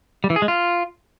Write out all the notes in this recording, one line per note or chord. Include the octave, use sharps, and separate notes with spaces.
G3
E3
G#4
G#3
F4